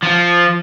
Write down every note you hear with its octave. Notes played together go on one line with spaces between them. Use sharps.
F3